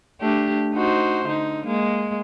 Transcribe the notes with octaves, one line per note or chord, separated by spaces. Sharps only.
A3 D4 G4
D#4 F#4 C5
D3 D#4
G#3 A#3